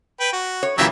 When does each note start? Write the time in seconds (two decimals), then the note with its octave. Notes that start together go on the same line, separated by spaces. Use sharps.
0.20 B4 G5
0.32 F#4
0.63 C#5
0.78 F#2 A#2 E3 F#3 G4 E5